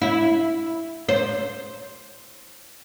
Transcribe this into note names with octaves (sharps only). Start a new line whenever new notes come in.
E4
C5